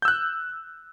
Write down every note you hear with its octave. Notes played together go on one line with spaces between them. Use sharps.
E6 F#6 G6